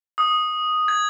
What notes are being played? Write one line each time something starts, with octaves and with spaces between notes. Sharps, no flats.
D#6
G#6